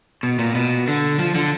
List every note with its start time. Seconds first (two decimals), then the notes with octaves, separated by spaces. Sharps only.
0.23 B2
0.39 A#2
0.55 B2
0.88 D3
1.19 F3
1.35 D3